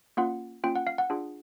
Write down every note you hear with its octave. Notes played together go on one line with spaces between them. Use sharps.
A#3 C#4 F4 F#5
A#3 C#4 F4 G5
F#5
F5
F#5
D4 F4 G#4